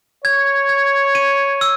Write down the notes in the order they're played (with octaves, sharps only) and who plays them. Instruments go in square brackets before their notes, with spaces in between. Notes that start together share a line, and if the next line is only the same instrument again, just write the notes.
[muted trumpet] C#5 [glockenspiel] G#6
[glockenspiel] G#6
D#7
E6